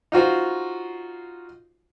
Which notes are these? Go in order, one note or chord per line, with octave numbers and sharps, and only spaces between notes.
D#4 F4 F#4 C5